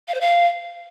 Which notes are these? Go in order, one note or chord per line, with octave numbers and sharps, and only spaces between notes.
F5
C5
F5